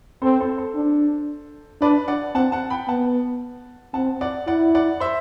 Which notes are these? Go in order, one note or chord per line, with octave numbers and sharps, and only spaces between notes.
C4 A4 C5
A4 C5
A4 C5
D4
D4 B4 D5
D5 F#5
C4 F#5 A5
F#5 A5
G5 B5
B3 F#5 A5
C4 F#5 A5
D5 F#5
E4 D5 F#5
D5 F#5
C5 E5